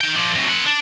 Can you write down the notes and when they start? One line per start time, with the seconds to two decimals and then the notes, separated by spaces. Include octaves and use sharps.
0.01 D#4 G5
0.16 F3 D4
0.35 C3 F#3
0.48 C4 F#5
0.66 D4